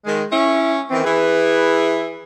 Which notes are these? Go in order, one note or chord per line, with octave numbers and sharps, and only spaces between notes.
D#3 G#3
C#4 E4
D#3 E3 C4
E3 E4 G#4 B4